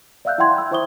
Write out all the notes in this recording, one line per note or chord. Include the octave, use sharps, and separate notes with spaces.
D5 E5 F5 E6 F#6 G6
E4 E5 F#5 G5 C6 G#6
B5 E6
E4 C5 E5 C#6 D#6 G7